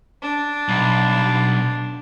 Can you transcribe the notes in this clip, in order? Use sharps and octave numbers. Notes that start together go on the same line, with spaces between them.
D4
B1